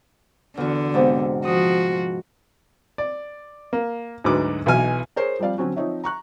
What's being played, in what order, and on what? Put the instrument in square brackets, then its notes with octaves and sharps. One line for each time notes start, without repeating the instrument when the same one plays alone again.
[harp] E2 F#4 [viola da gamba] D3
[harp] G#2 C3 B3
[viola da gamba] F3 F#4 [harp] D#6
[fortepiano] D5
A#3
D2 G#2 F#3 B4 D6
B1 B2 E3 D#4 G#5 F6
[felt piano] G#4 A#4 C5 C#5
F3 G3 C4 D5 F5
D3 F#3 C4 C#4 F#4
F3 C4 D#4 C#5 E5
A#5 C#6 F#6